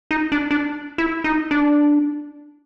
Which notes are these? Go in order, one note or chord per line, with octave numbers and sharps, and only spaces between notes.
D#4
D4
D4
E4
D#4
D4